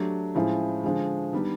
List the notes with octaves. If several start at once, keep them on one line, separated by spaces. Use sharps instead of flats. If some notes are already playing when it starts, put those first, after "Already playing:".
Already playing: F#3 A3 D4 G4
A2 F3 G#3 C#4 E4
D3 F3 G#3
D#3 G3 B3 D4